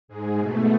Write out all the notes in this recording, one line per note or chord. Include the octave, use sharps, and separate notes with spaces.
G#2 G#3
B2 A3